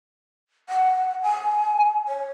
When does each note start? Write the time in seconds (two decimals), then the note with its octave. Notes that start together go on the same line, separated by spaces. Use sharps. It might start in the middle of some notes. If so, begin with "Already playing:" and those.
0.69 F#5
1.23 G#5
2.08 C#5